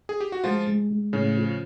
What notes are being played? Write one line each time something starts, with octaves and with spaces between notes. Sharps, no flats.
G#4
G4
F#4
F3 G#3 F4
G#3
G#3
A2 C#3 C#4
F3